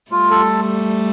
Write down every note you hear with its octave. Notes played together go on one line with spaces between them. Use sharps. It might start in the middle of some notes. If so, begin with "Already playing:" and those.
G3 A3 F4
A4